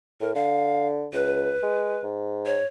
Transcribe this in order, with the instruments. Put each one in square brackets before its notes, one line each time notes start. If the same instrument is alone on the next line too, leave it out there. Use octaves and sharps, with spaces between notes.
[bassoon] A2 [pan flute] A#4
[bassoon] D3 [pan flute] F5
[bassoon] C#2 [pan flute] B4
[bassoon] G#3
G#2
[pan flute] C#5